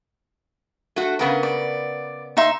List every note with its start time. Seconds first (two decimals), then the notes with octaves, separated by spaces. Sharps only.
0.96 A3 F#4
1.19 C#3 B3 A#4
1.43 D5
2.37 D#4 E5 C6